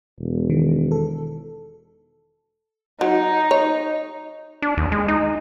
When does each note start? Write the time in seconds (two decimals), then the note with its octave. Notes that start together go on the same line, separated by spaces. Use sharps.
0.19 E1
0.50 D#3
0.91 A4
3.01 F#3 D#4
3.51 C#5
4.62 D4
4.77 D#2
4.92 G#3
5.08 D#4